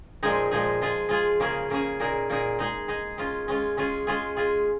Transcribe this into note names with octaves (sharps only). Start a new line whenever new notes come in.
A#2 F3 G#3 D#4 G#4
A#2 F3 G#3 D#4 G#4
G#3 F4 G#4
G#3 F4 G#4
C#3 A#3 C#4 G#4
C#3 A#3 C#4 G#4
A#2 A#3 D#4 G#4
A#2 A#3 D#4 G#4
G#3 D#4 G#4
G#3 D#4 G#4
G#3 C#4 F4
G#3 C#4 F4
G#3 C#4 F4 G#4
G#3 C#4 F4 G#4
G#3 F4 G#4